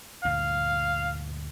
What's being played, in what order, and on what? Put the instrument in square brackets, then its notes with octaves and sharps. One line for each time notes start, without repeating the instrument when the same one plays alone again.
[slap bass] D2 G2 A#2 [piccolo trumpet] F5